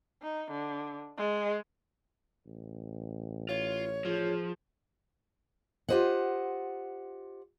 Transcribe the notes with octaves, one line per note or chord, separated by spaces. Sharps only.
D#4
D3
G#3
A1
F4 C#5
F3 F4 G#4
F4 G4 C5 D#5 F#5